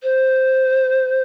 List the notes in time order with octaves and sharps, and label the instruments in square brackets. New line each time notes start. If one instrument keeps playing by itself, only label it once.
[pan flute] C5